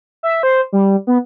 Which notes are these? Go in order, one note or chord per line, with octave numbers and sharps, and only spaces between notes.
E5
C5
G3
B3